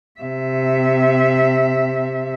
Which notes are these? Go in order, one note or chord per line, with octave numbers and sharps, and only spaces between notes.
C3 E5